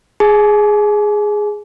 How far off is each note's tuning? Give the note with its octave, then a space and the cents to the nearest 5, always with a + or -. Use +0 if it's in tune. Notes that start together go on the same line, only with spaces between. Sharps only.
G#4 +0 G#5 +40